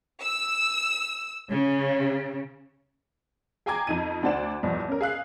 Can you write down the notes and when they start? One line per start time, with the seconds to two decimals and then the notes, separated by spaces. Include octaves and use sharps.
0.20 E6
1.51 C#3
3.66 G#4 G5 G#5 A#5 D6 G#6
3.87 F2 D#4 D#7
4.23 D2 D4 C5 D5 F#5 E7
4.63 B1 E2 G2 F3
4.88 C#4 A#4
5.01 G#4 F5 F#6 C7